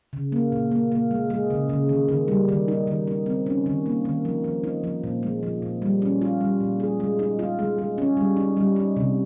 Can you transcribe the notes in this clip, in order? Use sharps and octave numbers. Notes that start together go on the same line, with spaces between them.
C#3
A#3
A#2
A#3
A#3
G#3
G#3
C#3
C#3
D#3
D#3
G3
D#3
D#4
D#3
D#4
C4
C#4
D#3
A#3
D#3
F3
F3
D#4
F3
A#2
G#3
F3
A#2
G3
C#4
F4
G3
A#2
G#4
G#3
D#4
F4
G#3
G#3
C#4
G3
D#4
G3
D#4
C3